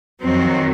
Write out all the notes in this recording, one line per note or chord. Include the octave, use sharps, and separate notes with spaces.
F2 D#3 F#3 C4